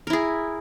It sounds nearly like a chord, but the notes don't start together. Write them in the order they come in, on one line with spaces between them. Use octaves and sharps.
A#4 E4 G#4